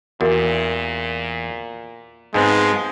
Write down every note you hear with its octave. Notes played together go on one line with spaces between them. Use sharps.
E2 A#2 F#4 A#4 F5
G#2 F3 G#3 B3 C4 D#4 A#5